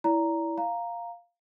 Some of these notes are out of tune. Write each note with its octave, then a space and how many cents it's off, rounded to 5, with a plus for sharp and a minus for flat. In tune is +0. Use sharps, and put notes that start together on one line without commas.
E4 +0 D5 -35 A#5 +0
F5 +0 A#5 +0